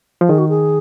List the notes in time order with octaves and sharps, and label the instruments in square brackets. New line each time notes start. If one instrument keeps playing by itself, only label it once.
[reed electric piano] F3
[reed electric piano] D#3 [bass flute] G#4
[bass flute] F#4
G#4